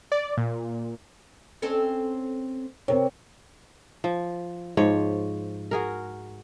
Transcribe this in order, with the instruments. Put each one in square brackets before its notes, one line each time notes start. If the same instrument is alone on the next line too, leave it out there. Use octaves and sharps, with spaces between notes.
[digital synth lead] D5
A#2
[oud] C4 C#4 A4
[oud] C3 [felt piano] C4 A#4 C#5
[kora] F3
G#2 F3 C#5
F#4 G#4 A#4